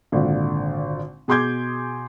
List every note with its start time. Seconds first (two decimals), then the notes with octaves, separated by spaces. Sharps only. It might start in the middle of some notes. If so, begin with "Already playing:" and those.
0.12 G#1 A#2 D3
1.28 B2 G#4 C6 D6 G6 G#6